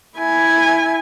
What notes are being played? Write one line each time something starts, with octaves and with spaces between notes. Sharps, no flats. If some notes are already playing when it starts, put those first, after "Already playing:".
E4 G#5